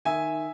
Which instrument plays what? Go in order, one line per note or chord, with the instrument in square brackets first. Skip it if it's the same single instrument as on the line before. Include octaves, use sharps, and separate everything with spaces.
[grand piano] D#3 E5 G#5